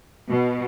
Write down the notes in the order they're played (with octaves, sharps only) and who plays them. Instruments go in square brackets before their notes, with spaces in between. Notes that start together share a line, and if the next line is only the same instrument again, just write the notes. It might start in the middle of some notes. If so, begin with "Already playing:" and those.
[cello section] B2